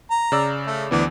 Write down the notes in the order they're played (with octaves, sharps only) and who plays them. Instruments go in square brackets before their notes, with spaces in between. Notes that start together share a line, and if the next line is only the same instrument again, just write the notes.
[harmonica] A#5
[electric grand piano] C#3 D5 E6
[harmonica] A3
[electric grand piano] D2 E3 B3 [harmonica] D4